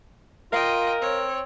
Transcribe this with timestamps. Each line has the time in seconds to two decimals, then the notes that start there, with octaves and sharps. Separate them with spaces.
0.53 F4 A#4 D#5 F5 G5
1.02 C4 C#5